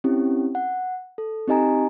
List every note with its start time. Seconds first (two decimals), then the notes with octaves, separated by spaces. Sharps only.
0.04 C4 C#4 E4 G4
0.55 F#5
1.18 A4
1.48 C4 D#4 G4 D#5 G#5 A#5